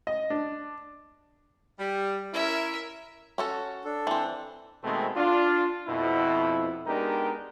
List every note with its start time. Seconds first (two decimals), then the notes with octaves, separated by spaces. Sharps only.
0.07 D#5
0.30 D4
1.79 G3
2.33 C#4 E4 A#4 E5
3.38 C#4 F#4 A4
3.85 D4 A4
4.07 E3 C4
4.84 B2 D#3 G#3 A3 C4
5.16 D4 F4
5.88 F2 B2 E4
6.87 G#3 B3 D4 D#4 G4 A#4